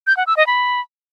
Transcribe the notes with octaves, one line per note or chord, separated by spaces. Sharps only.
G6
F#5
E6
D#5
B5